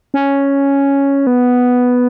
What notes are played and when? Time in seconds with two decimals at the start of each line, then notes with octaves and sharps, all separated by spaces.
0.14 C#4
1.27 B3